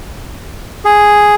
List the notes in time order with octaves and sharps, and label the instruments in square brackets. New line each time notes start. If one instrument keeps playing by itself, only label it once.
[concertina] G#4